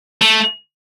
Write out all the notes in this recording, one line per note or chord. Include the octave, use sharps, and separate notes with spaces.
A3